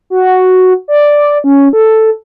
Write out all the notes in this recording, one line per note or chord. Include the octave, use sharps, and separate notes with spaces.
F#4
D5
C#4
A4